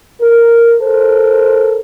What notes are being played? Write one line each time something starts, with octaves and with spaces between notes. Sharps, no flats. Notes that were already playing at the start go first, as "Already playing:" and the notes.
A#4
A4 A#4 C5